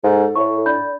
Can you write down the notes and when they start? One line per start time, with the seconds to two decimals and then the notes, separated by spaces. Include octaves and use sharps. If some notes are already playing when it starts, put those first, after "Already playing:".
0.04 G#2 A4
0.36 A2 C#5 C#6
0.66 D4 D5 B5 G6